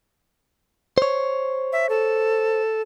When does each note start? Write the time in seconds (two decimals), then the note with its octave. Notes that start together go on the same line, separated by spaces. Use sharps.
0.98 C5 C#5
1.73 E5
1.89 A4